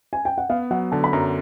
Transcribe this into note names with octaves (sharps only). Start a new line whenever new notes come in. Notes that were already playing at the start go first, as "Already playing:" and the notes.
G#5
G5
F#5
B3 F5
F#3 F#5
D3 A5
B5
F#2 A#5